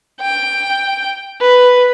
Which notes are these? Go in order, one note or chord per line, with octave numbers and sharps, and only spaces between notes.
G5
B4